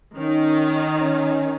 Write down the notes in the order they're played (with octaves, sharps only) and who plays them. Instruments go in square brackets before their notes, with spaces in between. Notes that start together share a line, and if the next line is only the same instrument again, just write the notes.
[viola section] D#3 [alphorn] C#4
[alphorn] C#4